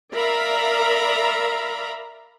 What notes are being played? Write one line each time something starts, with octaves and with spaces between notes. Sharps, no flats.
A#4 D5 E5 F5 A#5 B5